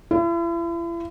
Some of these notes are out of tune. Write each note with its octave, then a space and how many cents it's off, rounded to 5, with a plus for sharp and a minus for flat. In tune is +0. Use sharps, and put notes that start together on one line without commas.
E4 +40